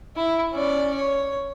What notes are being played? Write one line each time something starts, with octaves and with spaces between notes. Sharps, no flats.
E4
C#4 D5
C#5